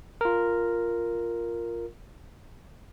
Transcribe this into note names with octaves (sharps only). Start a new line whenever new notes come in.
F4 A#4